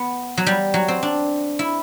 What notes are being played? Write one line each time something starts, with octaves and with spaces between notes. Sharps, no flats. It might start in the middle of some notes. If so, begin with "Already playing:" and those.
Already playing: B3
F#3
G3
F#3
C4
D4
E4